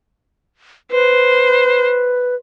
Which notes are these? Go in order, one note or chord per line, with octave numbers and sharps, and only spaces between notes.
B4 C5